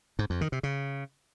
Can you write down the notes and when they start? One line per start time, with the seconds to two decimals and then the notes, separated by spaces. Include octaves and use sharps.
0.19 G#2
0.30 F2
0.41 D#3
0.52 C3
0.63 C#3